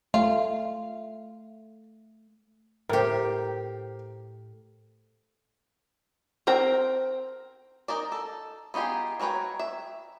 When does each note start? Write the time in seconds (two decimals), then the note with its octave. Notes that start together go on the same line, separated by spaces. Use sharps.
0.14 A3 F4
2.89 A2 G4 A#4 C5
6.47 C4 A#4 G5 A#5
7.88 D#4 A#4 D5
8.12 A4
8.74 B3 D#4 F4 G4 G#4
9.20 F#3 A#4 B4 C#5 G5
9.59 E5